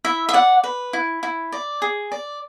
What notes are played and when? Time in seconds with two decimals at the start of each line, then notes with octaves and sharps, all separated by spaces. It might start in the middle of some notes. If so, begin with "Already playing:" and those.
0.05 E4 E5
0.29 E5
0.33 D5 F#5
0.64 B4
0.93 E4
1.23 E4
1.52 D5
1.82 G#4
2.12 D5